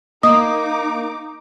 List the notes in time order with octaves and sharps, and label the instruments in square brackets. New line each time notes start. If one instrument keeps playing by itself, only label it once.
[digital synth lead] A#3 [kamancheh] D#4 D6 [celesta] D#5 [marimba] D#6